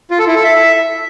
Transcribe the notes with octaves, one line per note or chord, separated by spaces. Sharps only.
F4
A4
E4
A4
E5